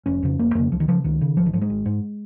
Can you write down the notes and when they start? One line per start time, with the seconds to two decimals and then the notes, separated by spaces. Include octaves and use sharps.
0.06 F1 C#4
0.23 F2 C#3
0.39 F1 A#3
0.55 F2 C#3 A#3
0.72 C#2 F3
0.80 D#3
0.88 C#3 F3
1.04 C#2 D#3
1.21 C#3
1.37 G#1 F3
1.46 D#3
1.53 G#2 F3
1.62 G#3
1.70 G#1
1.86 G#2